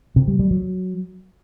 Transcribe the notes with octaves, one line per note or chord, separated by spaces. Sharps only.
C3
G3
G3
F#3